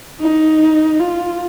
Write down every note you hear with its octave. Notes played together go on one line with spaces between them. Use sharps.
D#4
F4